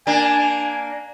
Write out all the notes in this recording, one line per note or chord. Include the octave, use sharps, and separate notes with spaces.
A#3 D4 G#5